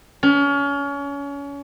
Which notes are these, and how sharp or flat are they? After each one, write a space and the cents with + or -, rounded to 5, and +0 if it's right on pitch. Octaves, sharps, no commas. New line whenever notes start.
C#4 +30